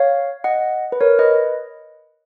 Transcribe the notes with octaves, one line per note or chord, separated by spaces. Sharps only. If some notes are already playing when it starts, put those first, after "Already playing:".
Already playing: C#5 F5
D#5 F#5
B4
A#4 C#5
B4 D#5